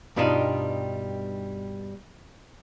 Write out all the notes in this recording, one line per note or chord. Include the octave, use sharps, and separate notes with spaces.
G2 B2 G3 D4 D#4 F4